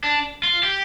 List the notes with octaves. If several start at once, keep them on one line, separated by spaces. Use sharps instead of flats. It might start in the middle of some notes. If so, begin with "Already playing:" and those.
D4
F4
G4